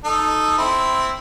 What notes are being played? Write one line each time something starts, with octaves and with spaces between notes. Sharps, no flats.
D#4 A4
C4 E4